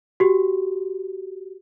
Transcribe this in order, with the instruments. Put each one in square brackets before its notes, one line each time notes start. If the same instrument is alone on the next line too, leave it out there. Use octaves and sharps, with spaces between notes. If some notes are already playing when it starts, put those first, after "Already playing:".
[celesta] F#4 G4